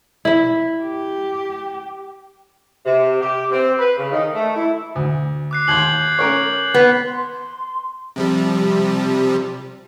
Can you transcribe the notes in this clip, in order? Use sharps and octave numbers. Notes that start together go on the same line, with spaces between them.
E4 E5
G4
C3
G4
C4
B4
C#3
D#3
A3
E4
D2
D6 F#6 C7
D#2 C6 G6 G#6 F#7
C#4 A#4 C#5
B3
C6
C3 F3 G3